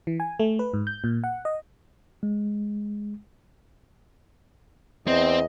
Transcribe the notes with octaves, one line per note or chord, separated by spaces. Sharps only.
E3
G#5
A3
B4
G#2
G6
A#2
F#5
D#5
G#3
E2 C4 D#5